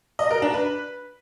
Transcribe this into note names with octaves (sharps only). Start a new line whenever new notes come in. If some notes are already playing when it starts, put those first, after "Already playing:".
D#5
A#4
D4
B4